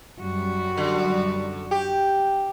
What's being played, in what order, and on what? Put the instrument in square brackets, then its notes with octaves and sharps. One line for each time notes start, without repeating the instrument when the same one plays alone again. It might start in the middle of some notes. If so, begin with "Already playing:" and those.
[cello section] F#2 G3 F#4
[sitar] D3
G4